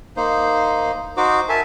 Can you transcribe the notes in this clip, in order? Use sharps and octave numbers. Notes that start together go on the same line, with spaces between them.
A#3 D#4 C5
D#4 F#4 C5 D6
A#4 E5 G#5 A5